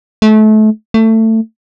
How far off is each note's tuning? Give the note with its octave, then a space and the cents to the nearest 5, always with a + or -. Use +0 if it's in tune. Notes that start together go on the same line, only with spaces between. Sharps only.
A3 -30
A3 +20